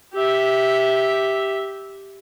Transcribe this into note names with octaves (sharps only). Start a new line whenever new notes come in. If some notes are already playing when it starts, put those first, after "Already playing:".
G4 E5